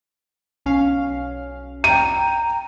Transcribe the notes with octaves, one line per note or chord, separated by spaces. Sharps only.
B1 C#4 F5
G5 A#5 D#7